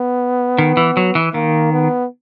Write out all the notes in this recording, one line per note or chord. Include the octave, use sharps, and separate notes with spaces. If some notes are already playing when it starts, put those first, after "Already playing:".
Already playing: B3
D#3
E3
F#3
E3
D#3 A#3
B3